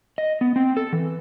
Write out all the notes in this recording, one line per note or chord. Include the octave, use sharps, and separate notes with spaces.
D#5
B3
C4
A4
E3